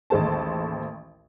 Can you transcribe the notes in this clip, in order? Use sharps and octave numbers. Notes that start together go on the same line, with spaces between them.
A1 D#2 G#3 A4 C5 A5